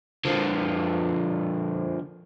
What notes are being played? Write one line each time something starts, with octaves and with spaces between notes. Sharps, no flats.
D3 F3